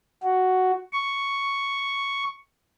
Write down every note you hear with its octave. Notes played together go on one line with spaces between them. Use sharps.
F#4
C#6